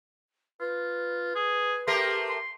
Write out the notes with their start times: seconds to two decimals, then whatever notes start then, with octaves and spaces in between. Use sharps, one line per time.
0.60 F4 B4
1.35 G#4
1.87 A3 G4 A#4 C6
2.30 C6